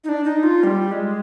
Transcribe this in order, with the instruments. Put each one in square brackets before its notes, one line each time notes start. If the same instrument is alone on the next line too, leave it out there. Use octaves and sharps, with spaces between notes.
[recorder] D#4
D4
D#4
F4
G3
G#3